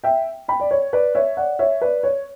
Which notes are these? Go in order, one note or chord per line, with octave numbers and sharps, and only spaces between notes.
E5 G5
G5 B5
D5
C#5
B4 D5
C#5 E5
D5 F#5
C#5 E5
B4 D5
C#5